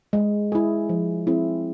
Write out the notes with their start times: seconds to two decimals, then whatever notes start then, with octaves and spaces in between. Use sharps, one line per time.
0.13 G#3
0.52 E4 G#4
0.89 F3
1.27 C4 E4 G#4